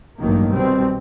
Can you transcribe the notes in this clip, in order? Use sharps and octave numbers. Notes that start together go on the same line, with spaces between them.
A1 G2 D#3 F#3 A#3
C2 B2 G3 C4